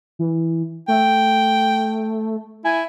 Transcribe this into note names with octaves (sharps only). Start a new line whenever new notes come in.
E3
A3 G5
E4 G#5